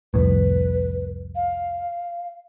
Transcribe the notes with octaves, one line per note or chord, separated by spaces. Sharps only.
C2 F2 A2 B4
F5